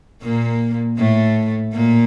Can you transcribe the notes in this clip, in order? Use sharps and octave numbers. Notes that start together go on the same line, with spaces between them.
A#2 A#3
A2 A3
A#2 A#3